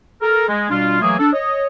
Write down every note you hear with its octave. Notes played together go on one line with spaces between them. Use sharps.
A4 A#4
G#3
B2 G3 D4 F4
E3 F#3 A3 A#3 G#4
D4 A4
C#5 D#5